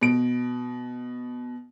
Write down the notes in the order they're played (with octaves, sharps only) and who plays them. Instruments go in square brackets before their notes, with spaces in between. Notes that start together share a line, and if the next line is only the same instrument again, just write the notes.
[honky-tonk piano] B2 D7